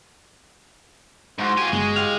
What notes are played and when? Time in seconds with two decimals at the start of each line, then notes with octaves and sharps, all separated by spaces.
1.39 G#2 F#4 C6
1.57 F4 G4 G#5
1.72 G1 G#3
1.96 G4 F5